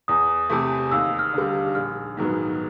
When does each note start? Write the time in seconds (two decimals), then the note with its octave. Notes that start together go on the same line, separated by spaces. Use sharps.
0.08 E2 D#6
0.50 C3 E3 A3
0.92 D#2 E6
1.19 F6
1.34 D3 G3
1.75 A#1 F6
2.17 G#2 D#3 F#3 B3